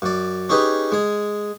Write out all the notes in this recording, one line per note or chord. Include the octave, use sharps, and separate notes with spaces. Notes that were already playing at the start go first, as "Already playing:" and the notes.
F#2 D5
C#4 D#4 G4 G#4 B4
G#3 G#4